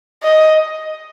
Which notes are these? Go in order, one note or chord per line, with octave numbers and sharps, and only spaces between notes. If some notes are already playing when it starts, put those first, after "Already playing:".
D#5